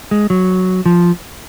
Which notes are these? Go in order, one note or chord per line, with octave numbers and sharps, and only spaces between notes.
G#3
F#3
F3